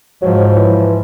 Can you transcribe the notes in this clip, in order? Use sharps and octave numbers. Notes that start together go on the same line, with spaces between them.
G#2 F3 F#3
E3